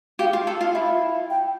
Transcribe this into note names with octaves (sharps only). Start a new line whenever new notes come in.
G4 F5
F4
A4
F4 F5
E4
G5